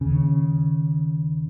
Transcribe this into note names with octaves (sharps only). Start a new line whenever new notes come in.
D#2 C#3